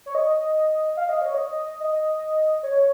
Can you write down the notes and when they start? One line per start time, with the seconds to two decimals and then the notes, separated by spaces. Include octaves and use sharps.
0.06 C#5
0.15 D#5
0.97 F5
1.09 D#5
1.22 C#5
1.34 D#5
1.80 D#5
2.63 C#5